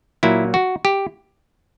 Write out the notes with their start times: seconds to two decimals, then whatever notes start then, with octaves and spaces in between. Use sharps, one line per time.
0.23 A#2 F#3 A#3 E4
0.54 F#4
0.85 G4